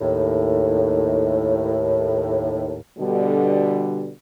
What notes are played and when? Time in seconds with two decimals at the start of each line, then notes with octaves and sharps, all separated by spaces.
0.01 D#2 A2
2.98 B2 D3 G3